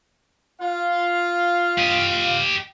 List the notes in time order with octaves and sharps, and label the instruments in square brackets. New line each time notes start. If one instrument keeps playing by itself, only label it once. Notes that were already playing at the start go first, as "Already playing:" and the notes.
[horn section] F4 F5
[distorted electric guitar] G4 D#5